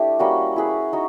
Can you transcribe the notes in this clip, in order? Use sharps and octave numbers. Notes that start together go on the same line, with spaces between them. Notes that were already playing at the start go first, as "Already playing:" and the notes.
Already playing: A3 D4 E4 G4
G3 A#3 C#4 F#4
E4 G#4 B4
D#4 F#4